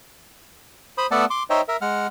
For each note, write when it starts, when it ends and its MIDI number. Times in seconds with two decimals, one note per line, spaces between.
0.98 1.06 72
0.98 1.06 83
0.98 1.06 87
1.11 1.25 57
1.11 1.25 59
1.11 1.25 69
1.11 1.25 74
1.11 1.25 78
1.11 1.25 81
1.30 1.43 84
1.30 1.43 86
1.50 1.61 63
1.50 1.61 72
1.50 1.61 73
1.50 1.61 75
1.50 1.61 76
1.50 1.61 79
1.68 1.77 70
1.68 1.77 76
1.81 2.07 56
1.81 2.07 78
1.81 2.07 89